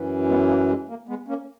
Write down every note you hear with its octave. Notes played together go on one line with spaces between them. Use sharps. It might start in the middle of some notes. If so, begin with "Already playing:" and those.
Already playing: F#2 E3
G#3 B3
A#3
G#3
A#3
G#3 B3
A#3 C#4